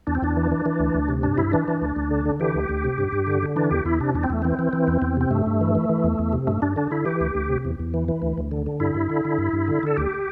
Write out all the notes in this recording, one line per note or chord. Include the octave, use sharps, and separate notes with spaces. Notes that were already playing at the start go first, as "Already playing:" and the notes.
E2 D4
C4
E2 D4
E3
E3
E3
D2
D2
C3
G2 D4
G2 E4
E3 D4
E3
D2
D2
D3
D3
E3 G4
D2
D2
C3
G2
G2
D3
D3
E3 D4
E2 G4
E2 E4
C3 D4
E2 D4
C4
E2 A3
E3 C4
E3
E3
E2
E2
C3 C4
G2 A3
G2
E3
E3
E3
E2
E2
C3
G2 A3
G2 D4
D3 D4
D3 E4
E3 G4
D2
D2
C3
E2
E2
E3
E3
D2
D2
D3
D3
G2 E4
G2
D3
D3
G2
G2
D3
D3 A4
D2 G4